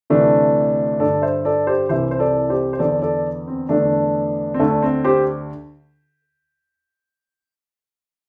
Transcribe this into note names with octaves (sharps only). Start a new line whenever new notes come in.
D2 C3 E3 A3 D4
G2 D3 A4 D5
C5 E5
A4 D5
G4 C5
C2 C3 E3 C5 E5
C5
A4 D5
G4 C5
C5
E2 D3 A4 D5
A4 D5
C4
E2 D3 A3 D4
C4
D2 D3 A3
D4
C4
G4 C5